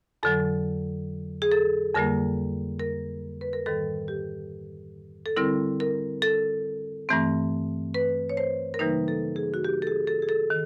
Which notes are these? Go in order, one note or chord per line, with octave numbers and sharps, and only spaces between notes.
F2 D3 F#3 A4
G#4
A4
F2 D3 G3 A#3 A#4
A#4
B4
A#4
G#2 D#3 G3 A4
G4
A4
D3 G3 C4 E4 A#4
A#4
A4
G2 E3 A3 C4
B4
C#5
C5
A#4
C#3 E3 G3 A#3 D#4 B4
A4
G#4
F#4
G4
A4
G#4
A4
G#4
A4
D#3